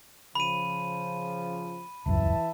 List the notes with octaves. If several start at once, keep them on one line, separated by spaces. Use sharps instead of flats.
C#3 F3 B5 D#7
D#1 C#2 F#2 E3 E5 A5